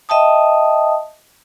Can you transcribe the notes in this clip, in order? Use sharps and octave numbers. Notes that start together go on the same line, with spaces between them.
D#5 E5 G5 A5 D#6